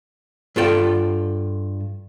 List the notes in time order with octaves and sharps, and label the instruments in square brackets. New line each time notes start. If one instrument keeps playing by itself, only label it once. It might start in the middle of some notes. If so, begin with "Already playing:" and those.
[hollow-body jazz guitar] G2 F4 A4 G5